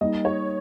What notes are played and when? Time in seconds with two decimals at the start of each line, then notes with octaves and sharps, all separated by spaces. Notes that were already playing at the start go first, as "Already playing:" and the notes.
0.01 G3 A#3 D#4 D#5
0.25 C#5